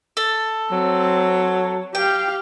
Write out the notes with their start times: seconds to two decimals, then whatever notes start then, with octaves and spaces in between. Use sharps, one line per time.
0.17 A4
0.72 F#3 C4
1.95 G4 F5 G5